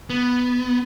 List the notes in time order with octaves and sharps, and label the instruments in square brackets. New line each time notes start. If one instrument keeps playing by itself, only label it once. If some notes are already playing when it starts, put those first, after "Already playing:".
[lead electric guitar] B3